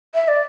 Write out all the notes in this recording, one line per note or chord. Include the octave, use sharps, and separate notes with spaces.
E5
D5